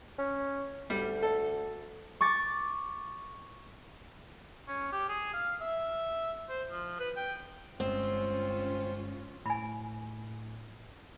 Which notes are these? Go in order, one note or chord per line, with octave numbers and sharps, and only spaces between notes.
C#4
D2 G3
A4
C#6 D6 A6
C#4
G4
G#4
F5
E5
C5
F3
B4
G5
G1 G2 G#3 C4 C#4 F4
A2 G#5 B5